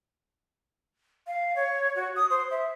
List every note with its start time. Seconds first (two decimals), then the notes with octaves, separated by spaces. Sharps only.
1.27 F5
1.56 C#5
1.95 F#4
2.16 D#6
2.30 C5
2.51 E5